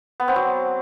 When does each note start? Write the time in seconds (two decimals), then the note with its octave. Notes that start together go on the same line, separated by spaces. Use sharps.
0.20 B3
0.28 C4
0.36 F#3